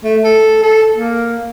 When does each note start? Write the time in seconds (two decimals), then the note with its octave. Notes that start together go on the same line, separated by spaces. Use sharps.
0.04 A3
0.24 A4
0.63 A4
0.96 A#3